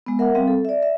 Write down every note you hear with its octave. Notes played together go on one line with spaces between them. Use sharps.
G#3 B3
A#4 E5 F#5
G3 C4 F5 G5
A4
D5 E5
E5